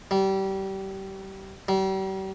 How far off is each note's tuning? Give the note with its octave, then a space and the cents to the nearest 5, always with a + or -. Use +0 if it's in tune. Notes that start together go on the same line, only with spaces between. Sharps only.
G3 -25
G3 -40